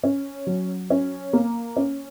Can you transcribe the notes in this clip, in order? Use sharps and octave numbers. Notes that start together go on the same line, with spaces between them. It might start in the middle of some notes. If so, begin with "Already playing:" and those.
C#4
F#3
C#4
A#3
C#4